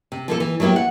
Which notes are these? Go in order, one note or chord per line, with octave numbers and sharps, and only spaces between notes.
C3
F3 A#3 A4
E3
F#3 A3 A#3 E4 G4
F#5